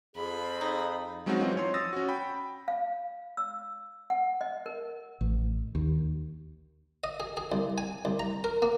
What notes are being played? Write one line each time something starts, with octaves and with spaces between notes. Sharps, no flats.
F2 G#4 B5
D#4
F#3 G#3 C4 C#4 D#4 F#4
E3 F#3 C4 F4 D#5
F3 C#5 C6
D#6 E6 A6 A#6
C#4 F#4
G5 B5
F5
E6
F#5
D#5
A#4
A1
D#2
D#5
G#4
G#4
C2
G#5
C2
A#5
A#4
A#3